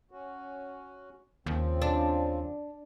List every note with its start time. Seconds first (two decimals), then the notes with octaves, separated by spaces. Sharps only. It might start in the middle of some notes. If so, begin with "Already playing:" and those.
0.11 C#4 F#4
1.46 D#2 C#3 F3 C4
1.82 D4